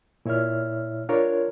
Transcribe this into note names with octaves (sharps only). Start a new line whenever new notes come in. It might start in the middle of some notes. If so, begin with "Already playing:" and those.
A#2 E4 C#5 E5 F6
D4 F4 A#4 C#5